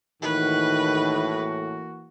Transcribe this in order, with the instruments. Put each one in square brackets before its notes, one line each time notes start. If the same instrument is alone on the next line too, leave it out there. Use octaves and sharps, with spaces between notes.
[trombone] A2 [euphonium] D#3 [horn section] E3 A#3 F#4 [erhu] B4